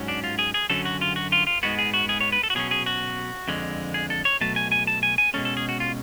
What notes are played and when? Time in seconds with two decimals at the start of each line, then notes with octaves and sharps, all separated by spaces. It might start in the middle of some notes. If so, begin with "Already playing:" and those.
Already playing: G#2 F#3 C#4
0.08 D4
0.24 F4
0.39 G#4
0.54 G#4
0.70 F#2 D3 F#3 C#4 A4
0.85 F#4
1.01 F4
1.16 F#4
1.32 F4
1.47 F4
1.63 G#2 G#3 B3 F#4
1.79 G#4
1.94 F#4
2.09 G#4
2.21 C#5
2.32 B4
2.43 A4
2.50 F#4
2.55 B2 F#3 C#4 G#4
2.71 G#4
2.86 F#4
3.48 F2 D3 G#3
3.94 G#4
4.10 A4
4.25 C#5
4.41 B2 F#3 A3 A5
4.56 G#5
4.72 G#5
4.87 A5
5.03 G#5
5.18 G#5
5.34 B2 G#3 C#4 A4
5.45 A4
5.57 G#4
5.69 F#4
5.80 F4